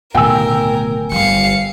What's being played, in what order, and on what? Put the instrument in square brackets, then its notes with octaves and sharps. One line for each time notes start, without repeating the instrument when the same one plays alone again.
[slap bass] D1 D#3 A3 [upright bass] B2 [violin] A#4 [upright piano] G5 G#5 E6
[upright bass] G1 G3 [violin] F5 C#7